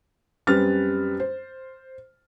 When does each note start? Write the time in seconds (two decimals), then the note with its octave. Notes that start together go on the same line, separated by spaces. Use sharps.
0.47 F#2 G3 C4 B4 F6 A6
1.20 C5